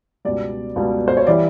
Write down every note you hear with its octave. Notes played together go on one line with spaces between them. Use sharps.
C#2 B2 G3 D5
C#2 B2 G3
C5
C#5
E3 G3 D5